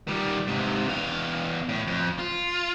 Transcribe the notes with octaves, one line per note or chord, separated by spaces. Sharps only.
D#3 G3
G#2 C3
E2 F5
A2
F2
F4